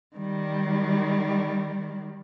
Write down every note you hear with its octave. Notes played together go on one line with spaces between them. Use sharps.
D#3 G3